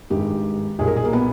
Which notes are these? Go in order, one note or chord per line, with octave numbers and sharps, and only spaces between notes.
G#1 G2 D#3 G#3 G4
B1 A#2 G3 G#4
A#4
G#4
A#3
B3